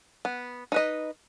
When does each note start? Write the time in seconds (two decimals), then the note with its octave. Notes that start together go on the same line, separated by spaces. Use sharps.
0.25 B3
0.72 D#4 B4 D#5